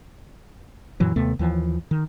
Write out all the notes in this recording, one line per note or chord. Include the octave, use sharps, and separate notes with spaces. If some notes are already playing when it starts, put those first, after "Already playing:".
F#2 A#2 E3 F#3
D#2 C3 A3 B3
D#2 E3 F3
D#3